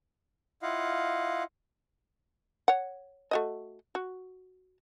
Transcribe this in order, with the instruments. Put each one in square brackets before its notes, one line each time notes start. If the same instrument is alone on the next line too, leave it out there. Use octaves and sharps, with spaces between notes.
[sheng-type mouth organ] E4 F4 D#5 F5 F#5
[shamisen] C#5 F#5
A3 F#4 D#5
F#4